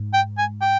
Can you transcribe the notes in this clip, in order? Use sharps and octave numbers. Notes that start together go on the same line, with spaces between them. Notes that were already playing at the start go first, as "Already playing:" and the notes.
Already playing: G#2
G5
G#5
G5